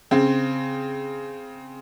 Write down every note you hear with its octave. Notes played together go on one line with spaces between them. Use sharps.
C#3 C4